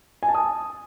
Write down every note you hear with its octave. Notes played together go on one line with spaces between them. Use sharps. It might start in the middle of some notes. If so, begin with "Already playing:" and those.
G#5
A5
D#6